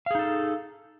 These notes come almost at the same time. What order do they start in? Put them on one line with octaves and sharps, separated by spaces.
F5 G#4 D#4 A4